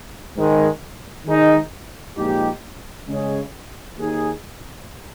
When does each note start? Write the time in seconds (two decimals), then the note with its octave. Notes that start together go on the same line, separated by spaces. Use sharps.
0.35 G#2 D#3 G#3
1.25 D#3 G#3 D#4
2.16 A#2 F3 G#3 D#4 G4
3.07 C#3 G#3 C#4 G#4
3.98 D#2 D#3 A#3 D#4 G#4